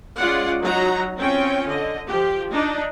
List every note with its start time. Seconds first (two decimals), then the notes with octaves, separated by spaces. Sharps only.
0.18 G#3 C#4 F4 D5 F#5
0.60 F#3 D#4 F#4 A#5
1.17 C4 C#4 F4 G5
1.67 D3 D#5
2.09 F3 G4
2.51 D4 D#4